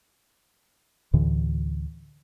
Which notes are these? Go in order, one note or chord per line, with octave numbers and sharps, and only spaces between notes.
D2 A2 D3 E3